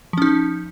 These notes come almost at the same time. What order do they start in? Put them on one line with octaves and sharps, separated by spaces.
F3 C#4 D#4